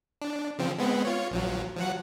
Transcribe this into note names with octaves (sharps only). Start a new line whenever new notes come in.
D4
C#3 F3 C4
G#3 B3 C4
F4 C#5
A#1 F3 F#3
F3 F#3 F#5